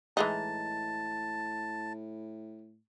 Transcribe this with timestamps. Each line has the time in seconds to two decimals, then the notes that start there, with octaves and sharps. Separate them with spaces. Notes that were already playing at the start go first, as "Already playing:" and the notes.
0.17 A2 E3 G#3 D#4 A5